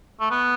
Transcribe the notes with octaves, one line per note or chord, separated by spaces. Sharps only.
A3
B3